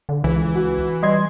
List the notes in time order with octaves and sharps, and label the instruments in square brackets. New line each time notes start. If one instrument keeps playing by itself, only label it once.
[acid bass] D3
[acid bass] C#2 [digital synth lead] E3
[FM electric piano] F#4
[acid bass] G3 [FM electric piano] D#5 C6 G#6